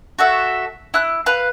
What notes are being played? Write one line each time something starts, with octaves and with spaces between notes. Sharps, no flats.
F#4 A4 E5
E4 F#6
B4 F5